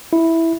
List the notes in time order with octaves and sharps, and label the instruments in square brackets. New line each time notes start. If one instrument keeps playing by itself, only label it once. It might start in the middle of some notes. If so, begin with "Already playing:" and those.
[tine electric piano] E4